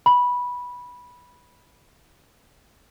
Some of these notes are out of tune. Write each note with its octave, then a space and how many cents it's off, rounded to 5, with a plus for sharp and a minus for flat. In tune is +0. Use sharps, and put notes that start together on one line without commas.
B5 -10